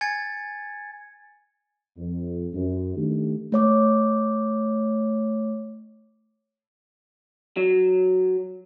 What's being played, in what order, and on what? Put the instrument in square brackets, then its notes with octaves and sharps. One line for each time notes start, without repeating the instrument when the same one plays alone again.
[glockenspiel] G#5 G#6 A6 C#7
[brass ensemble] F2
F#2
D#3 A3 D4 G4
[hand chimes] A3 C#5 D6
[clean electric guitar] F#3